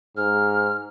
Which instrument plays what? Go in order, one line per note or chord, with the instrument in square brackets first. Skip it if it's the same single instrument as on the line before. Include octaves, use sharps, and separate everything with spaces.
[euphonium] G#2 [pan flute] F6